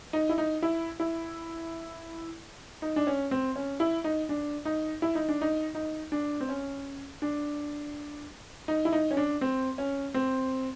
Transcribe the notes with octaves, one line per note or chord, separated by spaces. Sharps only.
D#4
E4
D#4
E4
E4
D#4
D4
C#4
C4
C#4
E4
D#4
D4
D#4
E4
D#4
D4
D#4
D#4
D4
C4
C#4
D4
D#4
E4
D#4
C#4
D4
C4
C#4
C4